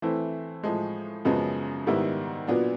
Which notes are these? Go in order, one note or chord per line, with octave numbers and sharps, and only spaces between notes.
E3 A3 C4 E4
A2 F3 G#3
F#2 C#3 F3 G#3 B3
G#2 D#3 G3 B3 E4
A#2 F#3 B3 D4